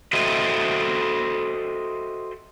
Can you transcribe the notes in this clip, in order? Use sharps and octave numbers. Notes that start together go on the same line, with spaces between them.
F#4 A4 C5 D#5 E5 G5